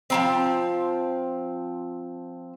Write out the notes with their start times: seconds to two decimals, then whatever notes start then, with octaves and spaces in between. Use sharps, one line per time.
0.10 F3 A#3 C4